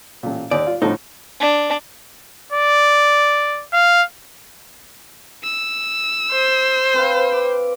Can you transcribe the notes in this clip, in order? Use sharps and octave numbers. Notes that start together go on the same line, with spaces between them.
A1 A#2
D#2 D5
F4
A2 D3 F3 D#4
D4
D5
F5
E6
C5
C4 B4 F5
D6